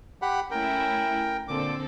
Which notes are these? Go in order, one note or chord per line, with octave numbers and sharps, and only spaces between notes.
G4 F#5 B5
A3 C#4 E4 A#4 G5
A#2 D3 C4 A4 D6